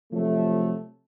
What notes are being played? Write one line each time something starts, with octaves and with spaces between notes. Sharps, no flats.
C3 F3 F#3 A3